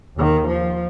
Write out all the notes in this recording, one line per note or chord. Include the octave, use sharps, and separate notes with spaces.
D#2 D#3
F3